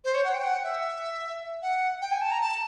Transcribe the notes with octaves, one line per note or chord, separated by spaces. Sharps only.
C5
C#5
F#5
G5
F#5
E5
F#5
G5
G#5
A5
A#5
A5